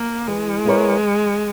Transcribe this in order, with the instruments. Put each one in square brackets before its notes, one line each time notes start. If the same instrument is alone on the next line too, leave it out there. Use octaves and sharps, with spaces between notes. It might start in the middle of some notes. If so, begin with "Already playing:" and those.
Already playing: [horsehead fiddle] A#3
[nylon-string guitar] E3 [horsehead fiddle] G#3
[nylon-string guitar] B3 E4 A#4 C#5